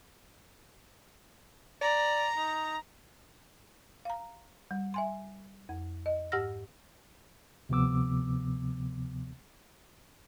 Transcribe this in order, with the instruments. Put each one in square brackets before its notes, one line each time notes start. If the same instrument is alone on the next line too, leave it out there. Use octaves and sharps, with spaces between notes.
[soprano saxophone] D5 [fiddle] A#5
[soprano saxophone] D#4
[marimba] F5 A#5
G3
E5 G#5 C6
F2
D#5
G#2 G4 F#5 E6 F6 A#6
[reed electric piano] D2 C3 F3 B3 D6 E6